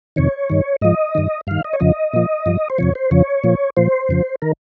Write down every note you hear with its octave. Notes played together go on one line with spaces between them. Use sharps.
F2 C3 D#3 C#5
G2 D#3
G#2 F3 D#5
G2 D#3
G2 D#3 F5
D#5
C#5
F2 C#3 F3 D#5
A#2 F3
G2 F3
C5
F2 C3 F3 C#5
C5
F2 C#3 F3 C#5
A#2 F3
A#2 F3 C5
F2 C#3 F3
D#3 A#4